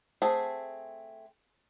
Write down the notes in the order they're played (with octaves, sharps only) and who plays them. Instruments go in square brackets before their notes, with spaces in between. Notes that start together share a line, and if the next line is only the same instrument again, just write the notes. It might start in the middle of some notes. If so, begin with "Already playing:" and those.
[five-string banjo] A3 C4 G#4